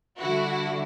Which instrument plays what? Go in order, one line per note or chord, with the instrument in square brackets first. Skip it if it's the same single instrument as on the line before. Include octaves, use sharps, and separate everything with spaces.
[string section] D3 G3 E4 F#4